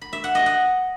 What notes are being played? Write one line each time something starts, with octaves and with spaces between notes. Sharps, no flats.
B5
E5
F#5
D#5
F#5